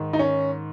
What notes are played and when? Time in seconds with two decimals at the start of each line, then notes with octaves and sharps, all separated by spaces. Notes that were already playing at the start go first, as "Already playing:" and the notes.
Already playing: G#2 D#3
0.13 D#4
0.19 C#4